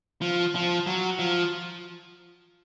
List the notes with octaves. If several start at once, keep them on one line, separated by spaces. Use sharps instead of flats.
F3
F3
F#3
F3